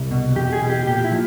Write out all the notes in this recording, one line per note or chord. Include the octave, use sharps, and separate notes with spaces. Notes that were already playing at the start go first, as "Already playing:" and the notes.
Already playing: C2
B2
E2 G4
G#4
B2
G4
A#2 G4
E4
F3